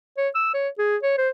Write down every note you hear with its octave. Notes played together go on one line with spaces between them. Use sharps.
C#5
E6
C#5
G#4
C#5
C5